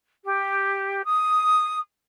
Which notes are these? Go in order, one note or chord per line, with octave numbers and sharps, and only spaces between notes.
G4
D#6